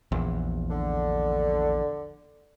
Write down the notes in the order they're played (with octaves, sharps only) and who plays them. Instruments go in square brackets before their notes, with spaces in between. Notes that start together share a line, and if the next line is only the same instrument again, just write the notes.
[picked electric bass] A#1 E2
[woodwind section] D3